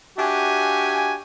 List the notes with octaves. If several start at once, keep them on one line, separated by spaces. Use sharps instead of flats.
D4 F#4 G4 E5 G#5